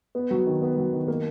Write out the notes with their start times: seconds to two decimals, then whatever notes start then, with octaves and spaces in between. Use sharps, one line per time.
0.15 B3
0.31 F#3
0.46 D#3
0.62 B3
0.77 F#3
0.93 D#3
1.08 A#3